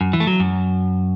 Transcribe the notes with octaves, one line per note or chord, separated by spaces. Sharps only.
F#2
E3
A3
F#3
F#2